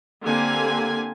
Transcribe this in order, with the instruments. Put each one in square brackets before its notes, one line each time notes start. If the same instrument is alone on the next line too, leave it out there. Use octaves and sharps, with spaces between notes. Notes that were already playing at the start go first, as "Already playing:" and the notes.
[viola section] D3 A#3 C4 G4 G#5